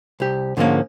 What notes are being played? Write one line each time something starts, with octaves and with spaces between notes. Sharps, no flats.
C2 G4
G#2 D3 F3 G#3 A#3 C#4